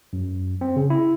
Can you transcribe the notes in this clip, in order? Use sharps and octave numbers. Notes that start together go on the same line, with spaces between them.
F#2
C4
C#3
E4